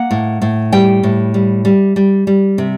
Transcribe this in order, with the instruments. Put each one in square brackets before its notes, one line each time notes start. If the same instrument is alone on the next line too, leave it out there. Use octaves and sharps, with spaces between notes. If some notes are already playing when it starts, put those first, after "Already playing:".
Already playing: [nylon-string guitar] A#3 F#5
A2
A2
G3 G5
A2
G3
G3
G3
G3
C3